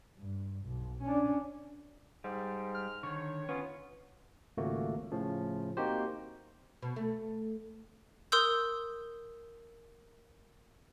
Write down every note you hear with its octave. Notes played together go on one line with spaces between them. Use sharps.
G2
B1
C#4 D4
G#2 G3
F6
D3 D#3 C#5
B3 C#4 F4
G#1 C#2 A3 A#3 F#4
A2 C#3 F3
A#3 C4 D#4 F#4 G4 C5
B2
A3
A#4 C6 D#6 E6 G6